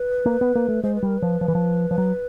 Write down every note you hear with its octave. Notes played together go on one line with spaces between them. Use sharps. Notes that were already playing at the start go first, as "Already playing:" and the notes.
Already playing: B4
A#3
B3
A#3
A3
G#3 C5
B4
G3 A#4
B4
F3
F3
E3
F3
F3
F#3